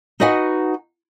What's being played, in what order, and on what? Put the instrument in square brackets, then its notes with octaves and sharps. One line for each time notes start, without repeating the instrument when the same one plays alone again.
[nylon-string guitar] D#4 F#4 B4 D#5 F#5 G#5